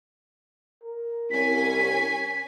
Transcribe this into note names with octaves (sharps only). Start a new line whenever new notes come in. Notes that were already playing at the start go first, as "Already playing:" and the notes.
A#4
C2 C#4 G#5 B6